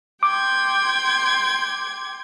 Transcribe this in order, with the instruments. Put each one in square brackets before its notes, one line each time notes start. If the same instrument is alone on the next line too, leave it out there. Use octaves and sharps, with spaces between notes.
[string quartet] G5 C6 G#6 [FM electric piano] D6